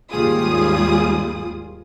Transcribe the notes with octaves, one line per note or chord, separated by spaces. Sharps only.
D#2 G#2 G3 F4 G#4 D#6